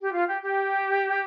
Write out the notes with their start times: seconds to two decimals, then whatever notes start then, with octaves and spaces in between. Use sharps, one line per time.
0.01 G4
0.12 F4
0.26 G4
0.41 G4